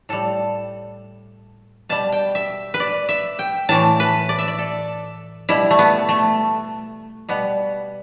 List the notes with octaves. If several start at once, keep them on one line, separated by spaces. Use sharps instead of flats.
A2 G3 A4
B2 G3 A5
G5
E5
B4
D5
E5
G5
A2 E3 A3 A5
B4
D5
E5
D5
A4
B2 G3 E4
A3
B3
A3
B2 G3 B3